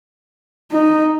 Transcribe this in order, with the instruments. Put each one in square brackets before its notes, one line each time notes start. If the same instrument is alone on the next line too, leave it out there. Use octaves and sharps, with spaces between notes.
[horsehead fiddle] D#4